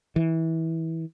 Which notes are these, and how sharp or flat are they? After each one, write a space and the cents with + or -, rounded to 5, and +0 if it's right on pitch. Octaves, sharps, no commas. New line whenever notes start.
E3 -20